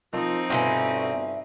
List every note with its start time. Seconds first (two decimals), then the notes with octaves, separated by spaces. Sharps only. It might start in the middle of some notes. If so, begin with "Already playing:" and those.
0.13 D#3 F3 C4 D#4 F4
0.50 G2 B2 D3 C#4 F4 E5